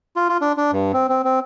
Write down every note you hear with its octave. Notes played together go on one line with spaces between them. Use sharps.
F4
F4
D4
D4
G2
C4
C4
C4